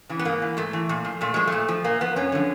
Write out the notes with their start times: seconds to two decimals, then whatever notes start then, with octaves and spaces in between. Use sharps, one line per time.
0.09 C#3 E3
0.19 B3
0.25 G#2 A#3
0.42 E3
0.57 G#2 A3
0.73 E3
0.89 A#2
1.05 F3
1.21 A#2 A3
1.34 F3 G#3
1.47 A#2 A3
1.68 F3
1.84 A#2 A#3
2.01 F3 B3
2.16 F#2 C#4
2.32 D3 F3